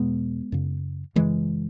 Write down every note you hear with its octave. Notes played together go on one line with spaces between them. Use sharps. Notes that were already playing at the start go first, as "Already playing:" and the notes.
Already playing: E2 B2 G#3 B3
F#2 C#3
F#2 C#3 E3 G#3